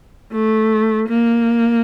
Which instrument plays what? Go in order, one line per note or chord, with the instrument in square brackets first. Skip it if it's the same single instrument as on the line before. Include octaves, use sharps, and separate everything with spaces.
[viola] A3
A#3